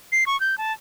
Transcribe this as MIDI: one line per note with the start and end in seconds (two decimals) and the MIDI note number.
0.12 0.24 96
0.26 0.39 85
0.40 0.58 91
0.58 0.72 81